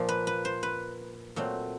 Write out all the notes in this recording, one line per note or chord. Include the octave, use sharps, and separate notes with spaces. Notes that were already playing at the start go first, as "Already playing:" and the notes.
Already playing: A#2 F3 A#3
B4
B4
C5
B4
A#2 F#3 A3 C4